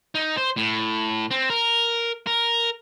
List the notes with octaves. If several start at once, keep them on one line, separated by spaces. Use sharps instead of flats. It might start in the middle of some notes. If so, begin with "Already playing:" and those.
D#4
C5
A2
C4
A#4
A#4